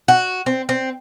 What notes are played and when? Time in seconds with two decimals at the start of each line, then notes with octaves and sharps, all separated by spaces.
0.08 F#4
0.46 C4
0.69 C4